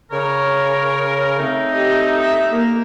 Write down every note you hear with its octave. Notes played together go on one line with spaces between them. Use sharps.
C#3 A#4 C#5
A3 C4 D#4
G4 D#5
E5
A#3 A#4